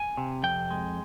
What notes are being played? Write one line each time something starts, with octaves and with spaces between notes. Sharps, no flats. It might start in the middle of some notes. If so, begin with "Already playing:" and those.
Already playing: G#5
C3
F2 G5
G#3